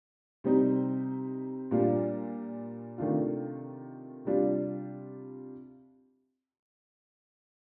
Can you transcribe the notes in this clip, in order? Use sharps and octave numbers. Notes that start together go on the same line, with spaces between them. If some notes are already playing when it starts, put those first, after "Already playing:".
C3 G3 C4 D#4
A#2 G3 D4 F4
C3 D#3 A3 D4 F4
C3 G3 D4 F4